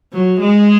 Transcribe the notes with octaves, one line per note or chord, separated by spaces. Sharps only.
F#3
G#3